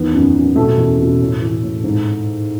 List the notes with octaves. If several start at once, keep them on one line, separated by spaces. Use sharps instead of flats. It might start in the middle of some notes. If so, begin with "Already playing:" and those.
Already playing: E2 D#3 B3
F#2
F#2
B2 A3
E2
B2
A2
E3
A2
G#2